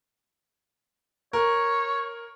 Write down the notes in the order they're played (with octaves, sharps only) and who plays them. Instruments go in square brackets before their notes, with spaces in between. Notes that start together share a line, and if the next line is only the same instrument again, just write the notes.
[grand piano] A#4 [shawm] C#5